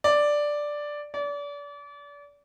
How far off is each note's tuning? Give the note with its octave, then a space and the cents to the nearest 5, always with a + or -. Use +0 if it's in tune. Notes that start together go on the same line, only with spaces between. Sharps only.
D5 +0
D5 -35